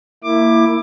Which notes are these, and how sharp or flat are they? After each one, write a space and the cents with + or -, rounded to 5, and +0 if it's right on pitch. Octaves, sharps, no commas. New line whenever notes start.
A#3 -20 E4 +0 D6 +15